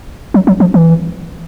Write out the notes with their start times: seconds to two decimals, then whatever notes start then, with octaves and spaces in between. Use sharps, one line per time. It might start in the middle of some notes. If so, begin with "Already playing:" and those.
0.34 F#3
0.47 F#3
0.60 F3
0.74 E3